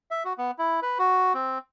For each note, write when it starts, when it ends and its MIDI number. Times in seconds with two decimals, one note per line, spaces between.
0.11 0.23 76
0.25 0.33 66
0.38 0.51 59
0.59 0.80 64
0.82 0.98 71
0.98 1.33 66
1.34 1.58 60